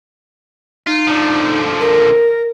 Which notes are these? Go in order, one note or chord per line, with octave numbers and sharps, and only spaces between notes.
D#4 F4
D3 F3
A#4